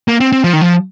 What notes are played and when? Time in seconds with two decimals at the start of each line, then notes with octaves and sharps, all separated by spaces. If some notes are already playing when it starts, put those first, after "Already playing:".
0.08 A#3
0.20 C4
0.32 C4
0.44 F3
0.53 D#3
0.61 F3